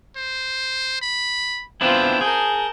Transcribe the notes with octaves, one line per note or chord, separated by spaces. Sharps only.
C5
B5
B3 C4 D4 E4 F4 G5
G#4 A#4 A5 G6